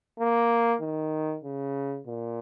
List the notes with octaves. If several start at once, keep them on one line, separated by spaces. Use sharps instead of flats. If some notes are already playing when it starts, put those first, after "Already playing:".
A#3
D#3
C#3
A#2